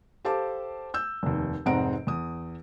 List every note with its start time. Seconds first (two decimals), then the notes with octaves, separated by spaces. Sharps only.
0.25 G4 A4 C5 F5 A5 D6
0.94 E6 G6
1.23 F1 D#2
1.66 F1 G#2 C4 F#5 A#5 D7
2.07 E2 D#6